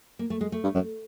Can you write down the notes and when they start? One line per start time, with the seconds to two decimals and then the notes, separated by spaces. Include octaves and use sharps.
0.19 A#3
0.30 A3
0.41 G#3
0.52 A3
0.63 G2
0.74 F#2